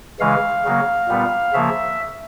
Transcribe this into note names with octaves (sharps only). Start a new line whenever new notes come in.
C#3 E3 G#3 F5
C#3 F#3 A#3
A#2 G3 B3
C#3 F3 A#3 E5